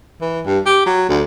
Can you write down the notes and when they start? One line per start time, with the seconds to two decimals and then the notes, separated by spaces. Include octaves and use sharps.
0.21 E3
0.46 G2
0.66 G4
0.86 F#3
1.09 D2